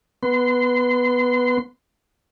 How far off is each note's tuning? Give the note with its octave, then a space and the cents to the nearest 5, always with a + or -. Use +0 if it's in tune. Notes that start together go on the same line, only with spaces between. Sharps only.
B3 +0 C6 -25